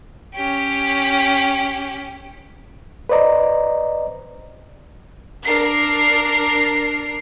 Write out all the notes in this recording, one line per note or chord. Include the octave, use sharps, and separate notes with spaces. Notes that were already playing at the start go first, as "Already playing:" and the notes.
C#4 G4
B4 C5 D5 D#5 A#5
D4 A#4 C7